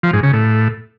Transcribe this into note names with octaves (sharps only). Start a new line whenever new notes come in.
F3
G#2
C#3
A2